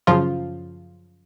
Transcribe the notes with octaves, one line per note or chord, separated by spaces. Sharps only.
F#2 C#3 F3 F4